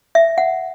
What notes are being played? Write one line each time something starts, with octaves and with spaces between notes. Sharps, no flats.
E5
F#5